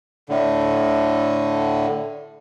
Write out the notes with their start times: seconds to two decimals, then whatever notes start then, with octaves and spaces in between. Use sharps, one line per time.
0.30 A2 D3